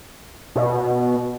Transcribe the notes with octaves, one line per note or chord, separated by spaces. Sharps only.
B2